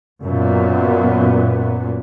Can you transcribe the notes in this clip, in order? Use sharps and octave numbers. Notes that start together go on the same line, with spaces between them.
F#2 A#2 B3